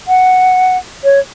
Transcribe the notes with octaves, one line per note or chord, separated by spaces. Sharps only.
F#5
C#5